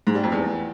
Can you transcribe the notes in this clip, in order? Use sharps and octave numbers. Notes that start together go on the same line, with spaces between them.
G#2
G3
F2
E2